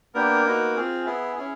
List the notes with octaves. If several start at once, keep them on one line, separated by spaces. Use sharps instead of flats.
A#3 B3 D4 G4 A#4
B3 D#4 F#4
C4 F4 G#4
B3 E4 G#4
C#4 E4 G#4